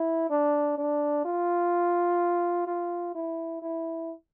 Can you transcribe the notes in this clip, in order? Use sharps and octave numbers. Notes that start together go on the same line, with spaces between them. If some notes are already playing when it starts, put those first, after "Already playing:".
Already playing: E4
D4
D4
F4
F4
E4
E4